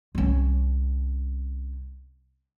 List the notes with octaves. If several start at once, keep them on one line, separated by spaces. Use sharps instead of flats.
C2 C#4